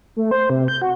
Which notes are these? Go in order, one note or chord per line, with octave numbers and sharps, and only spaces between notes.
A3
C5
C3
G6
F#4